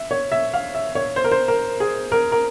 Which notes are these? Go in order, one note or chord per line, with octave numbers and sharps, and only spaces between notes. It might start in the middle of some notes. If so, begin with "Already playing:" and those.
Already playing: E5
C#5
E5
F5
E5
C#5
C5
A#4
C5
A#4
G#4
A#4
A#4